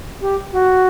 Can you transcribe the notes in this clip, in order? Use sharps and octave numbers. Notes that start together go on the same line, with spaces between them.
G4
F#4